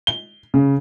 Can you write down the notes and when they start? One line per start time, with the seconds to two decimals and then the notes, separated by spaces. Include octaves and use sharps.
0.07 G7
0.54 C#3